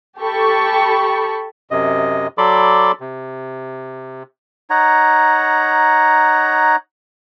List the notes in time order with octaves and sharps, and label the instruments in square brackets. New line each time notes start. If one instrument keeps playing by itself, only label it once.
[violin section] G4 A4 G5 A5 B5 C#6
[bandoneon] F#2 C3 D#5
F#3 A4 D5 B5 C6 D6
C3
[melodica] D#4 C#5 F#5 A#5